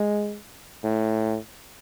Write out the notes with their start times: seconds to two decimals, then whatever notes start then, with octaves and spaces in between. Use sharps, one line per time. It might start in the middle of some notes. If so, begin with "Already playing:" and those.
Already playing: G#3
0.84 A2